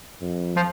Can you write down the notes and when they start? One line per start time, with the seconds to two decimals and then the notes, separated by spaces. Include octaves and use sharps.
0.21 F2
0.56 F3